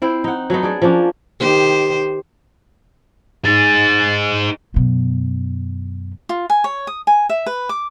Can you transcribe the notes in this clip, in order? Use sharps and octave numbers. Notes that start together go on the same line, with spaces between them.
C4 E4 C5
D#4 F#5
F#3 A3 B3 D#4
D4 G#4 D5
F3 A#3 C#4 D4
D#3 G4 C5
D#4 G#4 A6
F#2 B2
F4
G#5
C#5
D#6
G#5
E5
B4
D6